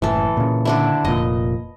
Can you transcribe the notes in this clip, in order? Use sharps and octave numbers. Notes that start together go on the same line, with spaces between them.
F#1 A2 E3 A4
A#2 C#3
D3 D4 E4
F1 A#2 D#5